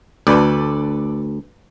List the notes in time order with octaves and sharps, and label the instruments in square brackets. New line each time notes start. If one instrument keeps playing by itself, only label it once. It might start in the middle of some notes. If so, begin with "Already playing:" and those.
[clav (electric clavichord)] D2 [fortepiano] A4 B4 D5